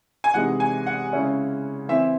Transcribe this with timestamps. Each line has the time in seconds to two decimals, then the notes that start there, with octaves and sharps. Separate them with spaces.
0.24 G#5
0.34 C3 E3 G#3 D#4 F#5
0.60 G#5
0.86 F#5
1.12 C#3 G#3 C#4 E4
1.89 E3 C4 E4 E5